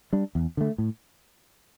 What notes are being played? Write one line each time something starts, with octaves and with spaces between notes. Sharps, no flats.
G3 D4
E2
D3 A3
A2